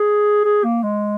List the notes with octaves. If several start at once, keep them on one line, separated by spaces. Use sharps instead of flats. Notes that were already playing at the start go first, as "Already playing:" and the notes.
Already playing: G#4
G#4
A#3
G#3